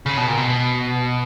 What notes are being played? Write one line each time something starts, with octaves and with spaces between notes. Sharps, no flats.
C#3
B2
A#2
B2